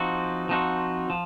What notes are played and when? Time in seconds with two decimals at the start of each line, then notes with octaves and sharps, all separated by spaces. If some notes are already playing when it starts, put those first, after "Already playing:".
Already playing: F3 C4 D#4 F#4
0.49 F3 C4 D#4 F#4
1.10 F3